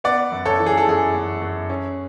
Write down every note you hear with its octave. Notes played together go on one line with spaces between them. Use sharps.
B3 D5 F#5
F#2
A4 C#5
E3
G#4
A4
F#2 G#4
F#2
F#2
C#4